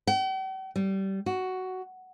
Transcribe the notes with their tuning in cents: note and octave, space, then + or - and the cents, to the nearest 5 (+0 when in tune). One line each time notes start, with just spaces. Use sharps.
G5 -45
G3 -20
F#4 +10